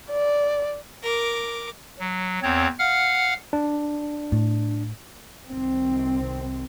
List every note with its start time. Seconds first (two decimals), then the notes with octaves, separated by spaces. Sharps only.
0.11 D5
1.03 A#4 D6
1.99 F#3
2.43 E2 C4 C#5
2.79 F5 F#5 F6
3.53 D4
4.32 A2
5.48 C2 D#3 C4